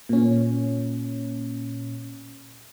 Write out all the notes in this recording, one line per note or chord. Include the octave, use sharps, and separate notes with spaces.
A#2 C#4